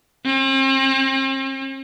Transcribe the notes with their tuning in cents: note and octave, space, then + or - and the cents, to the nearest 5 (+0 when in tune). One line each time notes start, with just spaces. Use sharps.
C4 +40